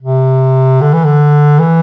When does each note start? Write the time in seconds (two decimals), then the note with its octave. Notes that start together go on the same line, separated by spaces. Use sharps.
0.02 C3
0.81 D3
0.93 E3
1.05 D3
1.59 E3